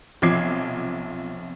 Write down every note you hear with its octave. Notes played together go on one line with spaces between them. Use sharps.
B1 C3 F3 D6 G#6 C7